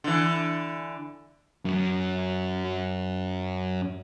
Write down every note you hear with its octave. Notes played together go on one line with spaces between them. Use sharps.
D3 E3
F#2 F#3